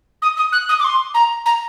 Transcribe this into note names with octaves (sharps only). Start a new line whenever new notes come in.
D#6
D#6
F#6
D#6
D6
C6
A#5
A#5